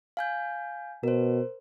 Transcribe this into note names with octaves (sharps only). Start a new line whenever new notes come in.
F5 G#5 G6
B2 A#4 C5